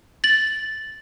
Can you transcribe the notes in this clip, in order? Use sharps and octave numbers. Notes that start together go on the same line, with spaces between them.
A6 F#7